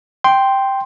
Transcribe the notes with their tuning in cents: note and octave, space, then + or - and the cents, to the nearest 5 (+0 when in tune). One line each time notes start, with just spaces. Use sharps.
G5 +0 C6 +0